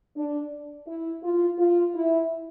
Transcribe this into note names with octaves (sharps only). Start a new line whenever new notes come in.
D4
E4
F4
F4
E4